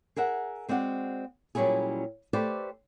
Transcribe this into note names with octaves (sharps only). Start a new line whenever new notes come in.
G#4 A#4 E5 F#5
G#3 C4 F#4 D5 F#5
A#2 F#3 G3 C#4 E4 G#4
A3 G4 B4 C5 D5